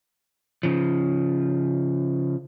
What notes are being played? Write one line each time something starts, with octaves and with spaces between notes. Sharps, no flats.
C#3 F3